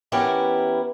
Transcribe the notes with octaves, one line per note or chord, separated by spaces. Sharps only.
E3 B3 C#4 E4 G4 A#4